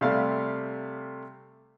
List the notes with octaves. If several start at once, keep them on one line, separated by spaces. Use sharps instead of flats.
C3 G3 A3 F5 C6